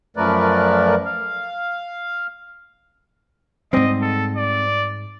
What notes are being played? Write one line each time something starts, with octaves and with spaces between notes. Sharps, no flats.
F#2 F3 A3 A#4 B4 D5
F5
G#2 G3 C4 D#5
A4
D5